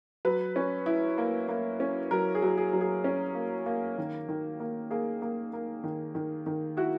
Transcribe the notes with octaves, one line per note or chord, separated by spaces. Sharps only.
F#3 B4
C#4
E4
A#3
A#3
C#4
F#3 A#4
G#4
F#3
G#4
F#3
G#4
C#4
A#3
A#3
D#3
D#3
A#3
A#3 G#4
A#3
A#3
D#3
D#3
D#3
E4 F#4